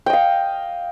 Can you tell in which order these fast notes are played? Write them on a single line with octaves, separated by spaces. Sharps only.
G5 D#5 F5